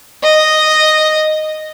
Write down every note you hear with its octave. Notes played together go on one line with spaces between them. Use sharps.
D#5